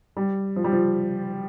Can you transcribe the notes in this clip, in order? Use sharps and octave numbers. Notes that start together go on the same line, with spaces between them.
G3
F3
G3
F3